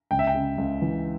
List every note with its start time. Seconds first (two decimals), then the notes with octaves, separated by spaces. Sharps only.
0.11 C#2 G5
0.19 E5
0.27 G5
0.35 C#3
0.58 C#2
0.82 E3